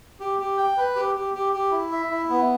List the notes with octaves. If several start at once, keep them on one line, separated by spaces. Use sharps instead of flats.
G4
G4
G5
B4
G4
G4
G4
G4
E4
E5
E4
B3